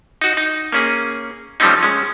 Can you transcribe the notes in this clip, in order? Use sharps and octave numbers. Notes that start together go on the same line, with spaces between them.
D#4 F#4
D#4
A#3 C#4 G#4
F3 G3 A3 C4 C#4 D#4
G#3 C#4